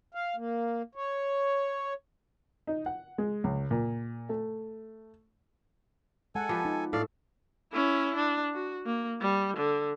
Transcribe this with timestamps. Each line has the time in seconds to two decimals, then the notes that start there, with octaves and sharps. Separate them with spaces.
0.15 F5
0.36 A#3
0.95 C#5
2.67 D#4
2.86 F#5
3.18 G#3
3.44 C#2
3.71 A#2
4.29 A3
6.35 G#3 A4 F#5 G#5
6.49 F3 B3 G4
6.65 D#4
6.93 A2 A4 D5 F5
7.73 C#4 E4
8.16 D4
8.54 F#4
8.86 A#3
9.21 G3
9.57 D3